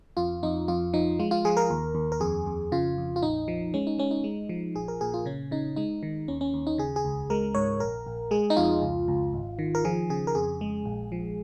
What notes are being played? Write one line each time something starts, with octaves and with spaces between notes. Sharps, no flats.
F2 F4
F2 D#4
F2 F4
F3 D#4
G#3 F4
F4
F3 G#4
A#4
D#2
D#2
A#4
F2 G#4
F2
C#3 F4
F2
F4
A#1 D#4
F3
G#3 C#4
D#4
G#3 C#4
D#4
G#3
F3
A#1 G#4
A#4
A#2 G#4
F4
C#3 C#4
C#3 D#4
G#3 D#4
D#3
D#2 C#4
C#4
D#2
D#4
C#3 G#4
G#4
C#2
G#3 A#4
G#2 C#5
A#1 A#4
A#1
G#3 G#4
D#4
F2 F4
C#2
C#2
G#1
D#3
A#4
F3 G#4
C#3 G#4
A#4
F2 G#4
G#3
A#1
F3